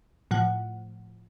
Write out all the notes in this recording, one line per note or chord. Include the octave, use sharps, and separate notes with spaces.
A2 F3 F#5